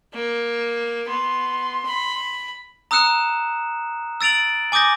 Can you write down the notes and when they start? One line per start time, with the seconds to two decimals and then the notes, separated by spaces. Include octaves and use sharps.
0.14 A#3
1.08 B3 C6
1.86 B5
2.91 A#5 D#6 E6 F#6 C#7 E7
4.21 E6 A6 D7 F7 F#7
4.72 G#5 D6 D#6 G6 A#6